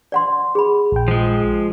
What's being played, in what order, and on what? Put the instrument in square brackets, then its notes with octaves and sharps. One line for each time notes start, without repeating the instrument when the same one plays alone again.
[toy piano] D5 F#5 C6
G#4 B5
[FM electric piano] A#1 G5
[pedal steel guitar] F3 G#3